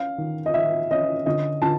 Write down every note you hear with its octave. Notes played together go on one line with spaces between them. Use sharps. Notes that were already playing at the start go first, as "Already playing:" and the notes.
Already playing: C#4 F5
D#3
D#5
D#3 E5
C#4 D#5
D3 D#5
D3 A5